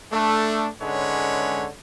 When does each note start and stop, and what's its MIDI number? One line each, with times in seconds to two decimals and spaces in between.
0.13 0.68 57
0.13 0.68 62
0.82 1.67 44
0.82 1.67 50
0.82 1.67 56
0.82 1.67 61
0.82 1.67 71
0.82 1.67 73